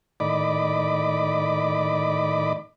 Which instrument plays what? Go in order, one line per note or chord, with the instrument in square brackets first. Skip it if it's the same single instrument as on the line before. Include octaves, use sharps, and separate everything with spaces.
[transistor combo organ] A2 D#3 D5 D#5 B5 D6